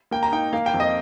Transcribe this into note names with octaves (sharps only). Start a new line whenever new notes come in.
A#3 G5
A#5
D#4 G5
A#3 F5
G5
F2
D#5